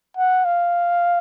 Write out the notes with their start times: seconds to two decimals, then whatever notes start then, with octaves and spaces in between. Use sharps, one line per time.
0.17 F#5
0.45 F5